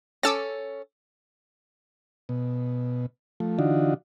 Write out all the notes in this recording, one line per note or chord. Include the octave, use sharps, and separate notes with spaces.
C#4 A4 D6 E6 A6
B2
F3 A3
D3 E3 D4 D#4 F4 F#4